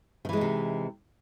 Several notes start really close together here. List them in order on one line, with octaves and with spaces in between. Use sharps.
D#3 E3 G#3 D#4 C3